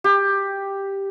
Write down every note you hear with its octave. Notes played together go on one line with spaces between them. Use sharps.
G4